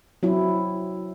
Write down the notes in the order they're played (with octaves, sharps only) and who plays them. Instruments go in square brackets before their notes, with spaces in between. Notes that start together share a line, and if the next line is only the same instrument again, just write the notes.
[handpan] F#3 C4 E4